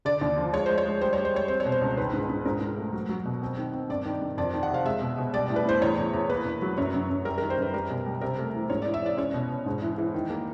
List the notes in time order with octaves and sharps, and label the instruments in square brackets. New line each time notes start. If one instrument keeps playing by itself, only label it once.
[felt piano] D3 D5
D#2
F3
G#3 C#5
G#3 C5
C#5
G#3
G3 C5
G3 C#5
C5
G3 C#5
C4 C5
C#5
B2
C5
C#2
D#3 B4
G#2
G#2
G#2 A#4
G#2
A3
F#3
F#3
B2
C4
D#3
C4
G2 D5
D#3
G2
F2 D5
D#3
F#5
C3 F5
G#3 E5
B2
B2
G3 D5
A2
B4
A2 C5
E2 C#5
E2
E2
A#3 B4
E2
F#3
F#2 C#5
F#2
F#2
G3 A#4
D#3 A#4
C5
F#2 B4
G3 A#4
B2
G3
C3 A#4
A3
E3
G#2 C#5
E3 D5
E5
E3 D5
C#4 C#5
B2
B2
G#2
E3
E3
D#3
A#3